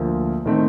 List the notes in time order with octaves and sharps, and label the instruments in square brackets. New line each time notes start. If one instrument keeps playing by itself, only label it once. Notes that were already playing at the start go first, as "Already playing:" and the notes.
Already playing: [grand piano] D2 D3 F3 A#3
D#3 A3 C4 D#4